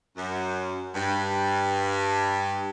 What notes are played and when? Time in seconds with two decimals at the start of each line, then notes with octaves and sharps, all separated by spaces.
0.16 F#2
0.94 G2